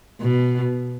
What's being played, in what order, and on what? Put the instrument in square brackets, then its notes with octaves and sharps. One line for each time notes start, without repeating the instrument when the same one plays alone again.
[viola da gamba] B2